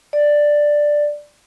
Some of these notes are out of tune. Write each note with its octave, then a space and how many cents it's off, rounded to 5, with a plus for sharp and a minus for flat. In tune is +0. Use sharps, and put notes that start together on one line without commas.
D5 +5